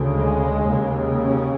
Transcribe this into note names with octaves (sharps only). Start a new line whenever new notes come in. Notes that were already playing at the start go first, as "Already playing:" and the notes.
Already playing: D2 C#3
G#3
D#2 C#3
C#4